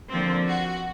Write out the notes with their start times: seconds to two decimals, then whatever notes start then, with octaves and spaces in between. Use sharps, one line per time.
0.10 D3 F3 A#3 C4
0.47 F#4